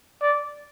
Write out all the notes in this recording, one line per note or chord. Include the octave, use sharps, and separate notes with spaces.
D5